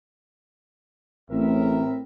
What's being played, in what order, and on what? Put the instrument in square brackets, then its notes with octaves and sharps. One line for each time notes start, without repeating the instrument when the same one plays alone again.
[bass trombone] A1 [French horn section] A2 C4 [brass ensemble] A#4 E5